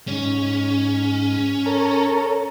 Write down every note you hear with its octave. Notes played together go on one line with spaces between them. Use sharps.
G#2 C#4
A4 A#4 C#5